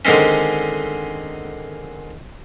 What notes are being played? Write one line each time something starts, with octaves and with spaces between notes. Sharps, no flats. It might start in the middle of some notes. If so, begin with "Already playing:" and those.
D3 D#3 G#3 C4 C#4